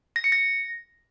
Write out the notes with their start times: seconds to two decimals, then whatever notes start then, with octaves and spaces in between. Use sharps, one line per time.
0.16 A#6
0.24 C#7
0.32 A#6